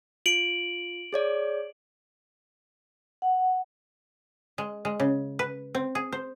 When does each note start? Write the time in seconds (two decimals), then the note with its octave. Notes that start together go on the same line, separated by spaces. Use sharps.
0.26 F4 D7 F#7
1.13 G#4 C#5 D5
3.22 F#5
4.58 G#3
4.85 G#3
5.00 C#3
5.39 B4
5.75 C4
5.95 G#4
6.12 C5